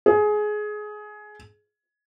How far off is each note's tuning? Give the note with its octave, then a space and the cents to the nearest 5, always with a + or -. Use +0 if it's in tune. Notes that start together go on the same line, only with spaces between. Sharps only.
G#4 +20